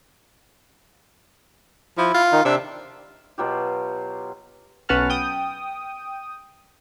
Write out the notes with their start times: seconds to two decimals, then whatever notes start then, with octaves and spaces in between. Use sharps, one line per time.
1.98 F3 E4
2.14 F4
2.32 D#3 D#4
2.45 C3 D4 E6
3.38 B2 F#3 F4 G4
4.89 B1 C#4 B4 F#5 A5 F6
5.10 G5 D#6